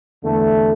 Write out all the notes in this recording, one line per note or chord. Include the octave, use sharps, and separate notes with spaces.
E2 D3 A3